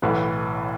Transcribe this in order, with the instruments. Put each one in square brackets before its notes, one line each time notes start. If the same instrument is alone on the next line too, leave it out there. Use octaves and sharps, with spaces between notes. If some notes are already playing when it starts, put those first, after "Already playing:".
[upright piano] B1 A2 E3 B3 B4